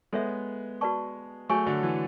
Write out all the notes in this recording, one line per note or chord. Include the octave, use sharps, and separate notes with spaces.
G#3 B3 A4 C#5 E5
F#4 B4 D5 A5 C#6
F#3 A3 G#4 C#5 G#5 C#6
D3 F#3
E3